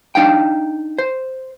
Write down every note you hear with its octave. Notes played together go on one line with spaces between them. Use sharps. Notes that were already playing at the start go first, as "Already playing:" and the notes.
D4 D#4 F5 G5
C5